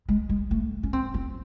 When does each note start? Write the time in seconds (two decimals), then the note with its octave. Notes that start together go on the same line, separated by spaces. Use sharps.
0.09 G#3
0.29 G#3
0.51 A3
0.83 C#4
0.93 C4
1.14 C4